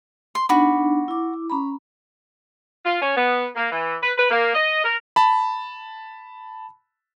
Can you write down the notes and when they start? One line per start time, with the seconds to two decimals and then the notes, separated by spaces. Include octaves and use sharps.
0.35 C6
0.49 B3 D4 D#4 F#4 B5
1.08 E4 D6
1.50 C#4 A#5 B5
2.85 F4
3.02 C#4
3.17 B3
3.56 A#3
3.71 E3
4.02 B4
4.17 B4
4.30 A#3
4.55 D#5
4.84 A#4
5.16 A5 B5